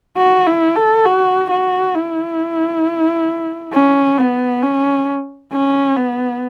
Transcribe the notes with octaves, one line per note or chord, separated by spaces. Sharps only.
F#4
E4
A4
F#4
F#4
E4
C#4
B3
C#4
C#4
B3